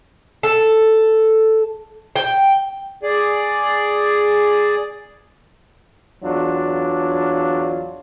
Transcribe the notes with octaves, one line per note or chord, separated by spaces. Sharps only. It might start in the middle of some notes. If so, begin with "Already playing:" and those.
A4
G5
G#4 D5
E2 F#3 D4 F4